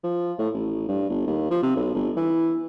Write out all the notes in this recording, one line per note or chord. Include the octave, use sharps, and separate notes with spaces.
F3
A2
A1
G2
G1
D#2
F3
C3
B1
G1
E3